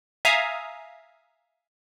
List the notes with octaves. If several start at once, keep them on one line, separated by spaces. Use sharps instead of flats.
E5 F5 G#5 A#5 D#6